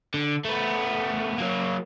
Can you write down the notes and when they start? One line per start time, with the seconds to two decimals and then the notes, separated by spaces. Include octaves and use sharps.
0.14 D3
0.45 A3 B3
1.38 F#3 A#3